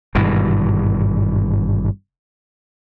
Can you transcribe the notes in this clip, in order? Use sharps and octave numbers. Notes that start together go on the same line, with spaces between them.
G#1 G2 B2 E3